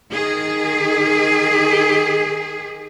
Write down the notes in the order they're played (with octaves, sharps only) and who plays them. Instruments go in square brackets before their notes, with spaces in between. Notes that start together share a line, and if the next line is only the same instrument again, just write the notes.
[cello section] D#3 G#4